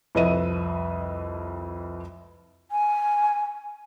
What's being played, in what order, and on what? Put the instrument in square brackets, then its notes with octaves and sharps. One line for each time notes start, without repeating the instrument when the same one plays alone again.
[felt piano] C2 F2 B4 D#5 E5 D#7
[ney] G#5